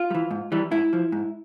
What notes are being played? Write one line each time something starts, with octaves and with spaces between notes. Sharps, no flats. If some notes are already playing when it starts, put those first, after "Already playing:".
Already playing: F4
G3
E3
G#2
E3 G3
G#2 E4
F3
G#2